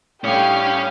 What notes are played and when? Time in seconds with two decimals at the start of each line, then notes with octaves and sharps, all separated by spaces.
0.24 A2 G3 C#4 D4 G4 C#5 F5 G5